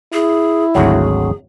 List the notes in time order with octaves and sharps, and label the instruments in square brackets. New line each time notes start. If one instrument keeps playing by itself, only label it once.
[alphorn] E4 [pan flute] G#4
[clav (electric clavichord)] G#1 D2 F#3 [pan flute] G#4